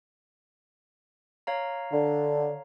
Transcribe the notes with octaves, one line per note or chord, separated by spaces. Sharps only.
C#5 F5 A#5
D3